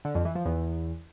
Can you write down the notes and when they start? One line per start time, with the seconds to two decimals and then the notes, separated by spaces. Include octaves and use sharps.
0.05 D3
0.15 F2
0.25 E3
0.35 F3
0.45 E2